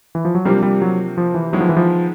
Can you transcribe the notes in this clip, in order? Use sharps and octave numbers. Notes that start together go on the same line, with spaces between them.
E3
F3
F#3
C3 F3 G3 A#3 D4
G3
F#3
F3
E3
D#3 F#3 G#3 B3 E4
F3
E3
F3